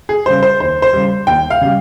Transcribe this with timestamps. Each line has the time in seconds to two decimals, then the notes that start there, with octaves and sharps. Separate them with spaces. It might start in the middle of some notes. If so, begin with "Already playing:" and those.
0.09 G#4
0.26 C#3 G3 C5
0.43 C5
0.60 D#2 C5
0.82 C5
0.93 C#3 G3
1.27 D#2 G5
1.50 F5
1.61 C#3 G3